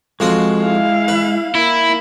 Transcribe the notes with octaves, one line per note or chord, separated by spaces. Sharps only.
F2 G#3 F4 F#4
E4 F5
B4
A#3 E4